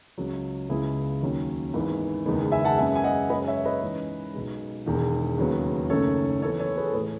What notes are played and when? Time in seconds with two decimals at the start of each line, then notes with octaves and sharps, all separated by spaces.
0.18 C#2 C#3 F#3
0.70 C#2 C#3 G#3 B3 E4 G#4
1.21 D#2 D#3 F#3 C#4
1.73 G#1 G#2 E3 B3
2.26 F#1 E2 D#3 G#3 B3
2.52 E5 G#5
2.65 F#5 A5
2.78 F#2 C#3 G#3 B3 E5 G#5
2.95 G#5
3.04 D#5 F#5
3.30 F#2 C#3 G#3 C#4 B4 D#5
3.47 C#5 E5
3.65 B4 D#5
3.82 G#2 E3 G#3 C#4
4.33 B1 B2 G#3
4.86 E1 E2 D#3
5.38 D#2 C#3 F#3 B3
5.90 F#1 F#2 D#3 A3 C#4 A4 C#5
6.42 F#2 E3 B3 A4 C#5
6.60 A4 C#5
6.77 G#4 B4
6.86 A4
6.94 A2 E3 G#4 B4